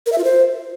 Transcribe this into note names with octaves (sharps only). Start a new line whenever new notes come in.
A#4
E5
F4
C5